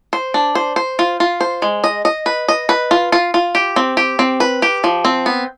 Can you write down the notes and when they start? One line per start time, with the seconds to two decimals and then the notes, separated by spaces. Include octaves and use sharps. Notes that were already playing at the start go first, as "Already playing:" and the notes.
0.13 C5
0.34 D4
0.55 C5
0.76 C5
0.99 F4
1.20 F4
1.41 C5
1.62 G#3
1.84 D#5
2.05 D#5
2.26 B4
2.48 D#5
2.69 B4
2.91 F4
3.12 F4
3.34 F4
3.55 G4
3.76 C4
3.97 G4
4.19 C4
4.40 B4
4.62 G4
4.84 F3
5.05 C4
5.26 B3